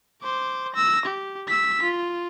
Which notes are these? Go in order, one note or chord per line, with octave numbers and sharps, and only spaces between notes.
C5 D6
E6 A#6
G4
E6 B6
F4